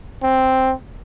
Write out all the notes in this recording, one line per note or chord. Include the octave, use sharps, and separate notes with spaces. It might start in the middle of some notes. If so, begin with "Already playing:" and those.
C4